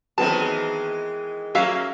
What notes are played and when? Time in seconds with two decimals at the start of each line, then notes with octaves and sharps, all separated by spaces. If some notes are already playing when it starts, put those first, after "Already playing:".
0.18 D#3 E3 F#3 G#3 B3 C4 A5
1.55 F#3 A#3 C#4 F#4 E5 F5